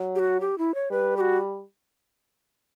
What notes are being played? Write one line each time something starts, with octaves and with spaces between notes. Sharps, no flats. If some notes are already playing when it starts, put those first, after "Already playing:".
Already playing: F#3
G4
F#4
G4
E4
C#5
G3 B4
G4
F#4